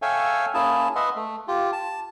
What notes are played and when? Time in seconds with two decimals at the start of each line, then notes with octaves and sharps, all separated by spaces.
0.02 A4 C#5 E5 F5 G5 G#5
0.54 A#3 C#4 E4 G#4 A5
0.96 B4 D#5 E5 F#5 C6
1.16 A3
1.48 F4 G4
1.72 A5